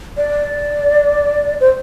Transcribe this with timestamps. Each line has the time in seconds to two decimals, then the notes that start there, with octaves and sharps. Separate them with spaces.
0.17 D5
1.60 C5